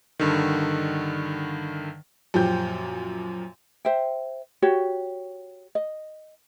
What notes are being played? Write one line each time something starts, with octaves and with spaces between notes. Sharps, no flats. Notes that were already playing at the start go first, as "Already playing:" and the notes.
G2 D3 D#3
F#2 A#2 F3 G4 G6
C5 E5 G5
F#4 G4 C#5
D#5